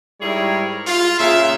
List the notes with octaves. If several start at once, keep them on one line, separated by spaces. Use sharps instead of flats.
G#2 G3 E4 G#4 A#4 C#5
F4
A#2 C#3 G#4 E5